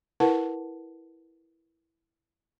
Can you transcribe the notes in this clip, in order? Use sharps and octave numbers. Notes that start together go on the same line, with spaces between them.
E4 A#4 B4 F#5 A5